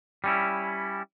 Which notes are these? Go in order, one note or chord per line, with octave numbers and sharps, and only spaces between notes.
G3 C#4 E4